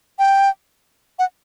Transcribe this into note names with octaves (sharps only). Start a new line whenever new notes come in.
G5
F#5